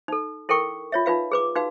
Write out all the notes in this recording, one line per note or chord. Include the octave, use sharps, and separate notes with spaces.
D#4 A4
E4 A4 A#4 G5 C#6
F4 C#5 E5
D#4 F4 B4 F5
G#4 B4 D6
D#4 F#4 B4 F5